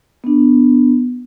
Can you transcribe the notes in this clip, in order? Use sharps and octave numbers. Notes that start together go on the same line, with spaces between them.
B3 D4